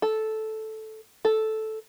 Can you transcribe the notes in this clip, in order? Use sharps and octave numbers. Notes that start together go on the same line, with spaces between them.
A4
A4